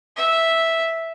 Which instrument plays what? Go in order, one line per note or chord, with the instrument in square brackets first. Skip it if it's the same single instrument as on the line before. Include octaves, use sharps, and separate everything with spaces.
[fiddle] E5